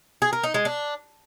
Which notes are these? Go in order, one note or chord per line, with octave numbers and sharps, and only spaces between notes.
G#4
A#4
D#4
G#3
D4